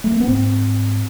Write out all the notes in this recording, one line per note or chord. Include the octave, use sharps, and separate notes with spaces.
A3
A#3
B3
G#2 C4